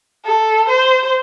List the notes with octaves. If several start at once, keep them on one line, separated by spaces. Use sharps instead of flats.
A4
C5